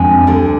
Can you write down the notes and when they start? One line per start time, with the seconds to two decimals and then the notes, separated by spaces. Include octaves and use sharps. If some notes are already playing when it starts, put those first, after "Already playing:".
Already playing: F2 G#3 D4 F4 G#5
0.27 D2 D3 G3